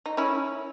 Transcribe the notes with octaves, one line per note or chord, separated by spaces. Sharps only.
D#4
C#4 E4